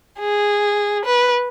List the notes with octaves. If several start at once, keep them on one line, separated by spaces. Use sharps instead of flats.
G#4
B4